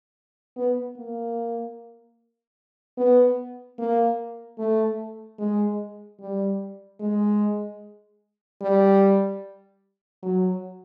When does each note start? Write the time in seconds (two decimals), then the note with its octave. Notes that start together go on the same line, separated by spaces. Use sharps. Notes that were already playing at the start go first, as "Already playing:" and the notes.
0.56 B3
0.97 A#3
2.97 B3
3.79 A#3
4.58 A3
5.39 G#3
6.20 G3
7.00 G#3
8.61 G3
10.23 F#3